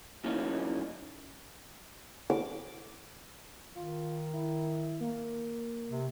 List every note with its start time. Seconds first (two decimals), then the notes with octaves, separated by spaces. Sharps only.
0.24 A#2 E3 F#3 A#3 C#4 D#4
2.30 D6
3.75 D#3 F4
4.33 E4
5.00 A#3
5.89 C3